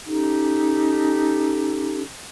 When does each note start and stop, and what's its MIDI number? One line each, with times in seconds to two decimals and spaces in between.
0.05 2.00 61
0.05 2.00 63
0.05 2.00 67
0.05 2.00 69